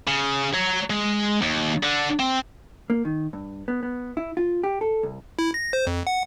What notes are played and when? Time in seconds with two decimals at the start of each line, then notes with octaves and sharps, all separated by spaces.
0.07 C#3
0.54 C#5 A#5
0.90 G#3
1.42 D#2
1.83 D3
2.20 C4
2.90 A#3
3.05 D#3
3.33 G2
3.68 B3
3.83 B3
4.17 E4
4.37 F4
4.63 G4
4.81 A4
5.03 C2
5.39 E4
5.54 A#6
5.73 C5
5.87 F2
6.07 F#5